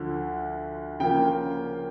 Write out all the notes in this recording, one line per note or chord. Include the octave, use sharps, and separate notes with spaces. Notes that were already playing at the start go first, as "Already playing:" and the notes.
Already playing: D2 D3 F3
C#3 F3 A#3 G5